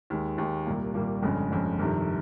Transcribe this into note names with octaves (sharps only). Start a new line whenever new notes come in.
D#2 D#3 G#3
D#2 D#3 G#3
C2 A#2 G3 A#3
C2 A#2 G3 A#3
G1 F2 C#3 G#3
G1 F2 C#3 G#3
G1 F2 C3 D#3